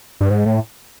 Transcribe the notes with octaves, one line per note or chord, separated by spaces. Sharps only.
G2
G#2
A2